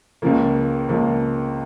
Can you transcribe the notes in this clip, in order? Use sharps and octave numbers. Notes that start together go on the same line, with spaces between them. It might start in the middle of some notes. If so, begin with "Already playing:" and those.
C#2 C#3 F3 A#3
C#2 C#3 F3 A#3